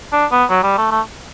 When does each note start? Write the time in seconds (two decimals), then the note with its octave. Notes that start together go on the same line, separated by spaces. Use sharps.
0.13 D4
0.32 B3
0.50 F#3
0.63 G3
0.78 A3
0.91 A3